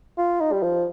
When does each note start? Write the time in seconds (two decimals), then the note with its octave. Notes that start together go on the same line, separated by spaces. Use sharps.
0.18 F4
0.41 D#4
0.53 G3
0.63 F3